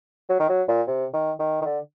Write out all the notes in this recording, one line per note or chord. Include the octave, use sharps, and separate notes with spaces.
F#3
D#3
F#3
A#2
C3
D#3
D#3
D#3
D3